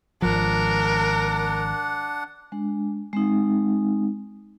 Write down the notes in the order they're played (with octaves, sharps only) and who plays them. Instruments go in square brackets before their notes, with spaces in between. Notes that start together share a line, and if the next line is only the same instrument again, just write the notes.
[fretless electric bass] G#1 F3 [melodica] D4 F#5 [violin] A#4
[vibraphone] G#3 D4
G#3 C4 D#4